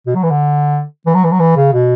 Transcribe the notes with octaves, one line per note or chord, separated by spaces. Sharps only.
B2
F#3
E3
D3
E3
F#3
E3
F#3
E3
C#3
B2